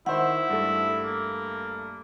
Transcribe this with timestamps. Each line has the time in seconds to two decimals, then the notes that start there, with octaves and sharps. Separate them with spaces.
0.06 D#3 E4 C5 F#5
0.49 G2 A3
1.04 A#3